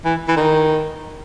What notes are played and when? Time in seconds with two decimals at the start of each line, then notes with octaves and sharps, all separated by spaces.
0.05 E3
0.28 E3
0.36 D#3